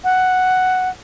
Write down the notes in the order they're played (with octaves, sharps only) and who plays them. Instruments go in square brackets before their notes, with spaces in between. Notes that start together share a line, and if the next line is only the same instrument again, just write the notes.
[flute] F#5